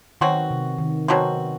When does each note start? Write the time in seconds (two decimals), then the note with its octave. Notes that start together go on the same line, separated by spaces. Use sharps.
0.21 B2 D#3 F#3 C4 F#4
0.51 C3
0.78 D#3
1.08 B2 F#3 C4 F#4